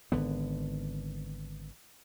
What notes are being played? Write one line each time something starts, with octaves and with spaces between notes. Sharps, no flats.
G#1 D3 B3